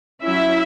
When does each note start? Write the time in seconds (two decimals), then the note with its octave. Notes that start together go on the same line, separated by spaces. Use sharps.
0.22 F#3 C#4 E4 E5